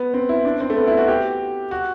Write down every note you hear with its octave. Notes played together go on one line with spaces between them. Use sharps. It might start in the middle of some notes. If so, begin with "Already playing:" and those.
Already playing: B3
C4
E4
D4
C4
A3
B3
E4
F#4
G4
F#4